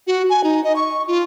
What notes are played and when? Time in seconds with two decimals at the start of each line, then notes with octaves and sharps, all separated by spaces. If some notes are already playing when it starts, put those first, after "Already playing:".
0.07 F#4
0.30 G#5
0.44 D#4
0.64 D#5
0.76 C#6
1.08 F4